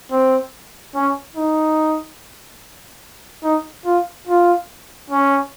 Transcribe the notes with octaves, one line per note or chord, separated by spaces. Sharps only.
C4
C#4
D#4
D#4
F4
F4
C#4